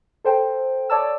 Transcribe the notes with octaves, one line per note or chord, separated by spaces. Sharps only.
A4 C5 G5
C#5 D5 A5 E6